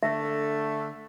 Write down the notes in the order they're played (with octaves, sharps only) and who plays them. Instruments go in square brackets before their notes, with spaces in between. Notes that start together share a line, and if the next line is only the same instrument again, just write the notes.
[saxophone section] D3 A3 [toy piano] E5